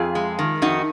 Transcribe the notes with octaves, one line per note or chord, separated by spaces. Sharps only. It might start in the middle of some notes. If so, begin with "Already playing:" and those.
Already playing: F2 F4 G#4
G#3
D#3
F2 D#4 F#4